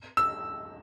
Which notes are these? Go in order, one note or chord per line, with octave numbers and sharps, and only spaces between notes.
E6